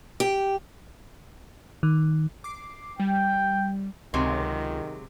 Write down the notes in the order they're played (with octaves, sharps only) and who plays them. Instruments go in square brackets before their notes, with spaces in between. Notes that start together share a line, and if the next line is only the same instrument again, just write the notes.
[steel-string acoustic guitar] G4
[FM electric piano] D#3
[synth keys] D6 C7
[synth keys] G3 [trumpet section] G5
[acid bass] C#2 [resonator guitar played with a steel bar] C3 F#3 G#3 [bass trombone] D#3